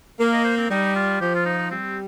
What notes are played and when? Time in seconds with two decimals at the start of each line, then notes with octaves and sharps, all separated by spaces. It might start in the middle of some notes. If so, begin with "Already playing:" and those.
0.20 A#3 F5
0.33 D#5
0.45 C5
0.58 C4
0.70 G3 D#4
0.95 F4
1.20 F3 G4
1.35 F4
1.46 D#4
1.71 G3 C4